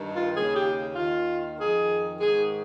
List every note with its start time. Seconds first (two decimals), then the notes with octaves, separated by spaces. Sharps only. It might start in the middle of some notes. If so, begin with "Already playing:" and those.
Already playing: G2 D#3
0.13 F4
0.33 D#2 C#3 G#4
0.54 G4
0.95 D#2 D#3 F4
1.58 F2 D#3 G#4
2.20 G#2 D#3 G#4